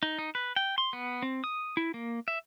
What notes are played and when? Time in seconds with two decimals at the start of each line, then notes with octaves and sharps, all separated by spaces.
0.03 D#4
0.19 D#4
0.35 B4
0.56 G5
0.78 C6
0.93 B3
1.22 C4
1.44 D#6
1.77 E4
1.94 A#3
2.28 E5